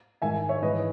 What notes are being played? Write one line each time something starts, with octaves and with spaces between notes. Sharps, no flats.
G#2 D#3 E5 G#5
C#5 E5
G#2 E3 B4 D#5